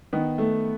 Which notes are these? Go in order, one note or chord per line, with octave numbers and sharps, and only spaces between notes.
D#3 B3
A3